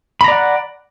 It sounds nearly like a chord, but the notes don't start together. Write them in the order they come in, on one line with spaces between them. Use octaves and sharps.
B5 A#5 D5 F#5